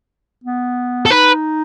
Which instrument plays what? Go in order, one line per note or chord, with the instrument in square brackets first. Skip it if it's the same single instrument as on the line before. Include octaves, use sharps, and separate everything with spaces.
[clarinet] B3
[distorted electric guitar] A4
[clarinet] D#4 [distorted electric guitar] B4